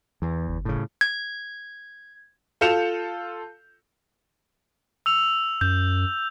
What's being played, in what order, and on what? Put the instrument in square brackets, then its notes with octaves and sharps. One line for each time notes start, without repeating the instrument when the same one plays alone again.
[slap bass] E2 [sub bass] E3
[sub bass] G1
[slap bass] A2 C#3
[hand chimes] G#6
[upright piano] F4 A4 G6 C#7 E7 F7
[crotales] E6 F7
[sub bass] F#2 [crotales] G6